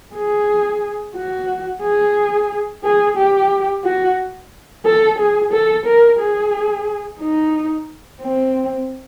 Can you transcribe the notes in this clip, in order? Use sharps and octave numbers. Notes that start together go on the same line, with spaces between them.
G#4
F#4
G#4
G#4
G4
F#4
A4
G#4
A4
A#4
G#4
D#4
C4